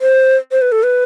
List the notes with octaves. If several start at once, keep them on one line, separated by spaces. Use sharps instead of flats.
C5
C5
B4
A4
B4